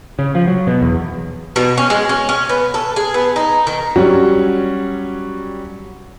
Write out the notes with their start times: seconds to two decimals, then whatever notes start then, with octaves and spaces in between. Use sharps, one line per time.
0.19 C#3
0.35 F3
0.47 F#3
0.67 B2
0.82 E2
1.56 B2
1.78 C#4
1.90 G#3
2.09 C#4
2.29 C#4
2.49 B3
2.74 A4
2.96 G#4
3.14 B3
3.36 D#4
3.67 D#3
3.96 F#3 G3 C#4 F#4